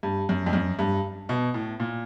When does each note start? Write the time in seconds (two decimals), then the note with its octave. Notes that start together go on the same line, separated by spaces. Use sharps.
0.03 G2
0.29 F#2
0.46 F2
0.53 F#2
0.79 G2
1.29 B2
1.54 A2
1.80 A#2